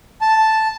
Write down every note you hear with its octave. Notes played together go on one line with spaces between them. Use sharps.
A5